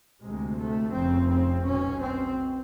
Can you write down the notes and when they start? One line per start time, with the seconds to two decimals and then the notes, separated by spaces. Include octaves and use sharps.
0.22 D2 C3 G#3
0.59 A3
0.94 F1 F2 C#3 C4
1.30 C4
1.65 B1 B2 C#4
2.01 C4